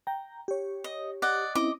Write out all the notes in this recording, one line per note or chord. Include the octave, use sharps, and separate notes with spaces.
G5 A#5
G4 C#5
D#5
D5 D#5 F#5
C4 C#4 E4 D#5 D6